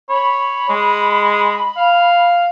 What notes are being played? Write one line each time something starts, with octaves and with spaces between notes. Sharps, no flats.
C#5 B5
G#3
F5